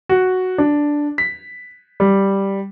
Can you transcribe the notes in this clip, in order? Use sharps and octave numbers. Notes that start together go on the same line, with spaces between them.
F#4
D4
B6
G3